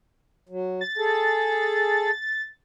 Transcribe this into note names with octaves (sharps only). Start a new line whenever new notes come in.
F#3
A6
G#4 A4